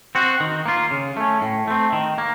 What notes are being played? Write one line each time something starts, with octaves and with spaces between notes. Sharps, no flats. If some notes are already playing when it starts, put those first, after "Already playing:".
C4 F#4
D#3
A#3 F4
C#3
A3 C#4
A2
A3 C4
D#3
A#3